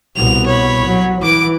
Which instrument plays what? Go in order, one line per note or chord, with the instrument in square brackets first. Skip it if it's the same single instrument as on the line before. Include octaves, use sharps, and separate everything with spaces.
[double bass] C2 B2 [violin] F7
[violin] C#5 B5
[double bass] F#3
[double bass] E3 [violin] D6 D7